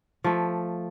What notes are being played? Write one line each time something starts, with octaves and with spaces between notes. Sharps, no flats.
F3 A3